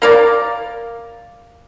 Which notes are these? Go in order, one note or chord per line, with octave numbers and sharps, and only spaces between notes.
A#3 A#4 D5